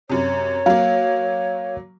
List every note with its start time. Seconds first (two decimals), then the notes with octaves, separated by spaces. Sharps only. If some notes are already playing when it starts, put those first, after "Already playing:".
0.10 F#2 C3 C#5
0.66 F#3 A#3 F5